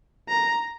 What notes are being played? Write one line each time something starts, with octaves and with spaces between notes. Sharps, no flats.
A#5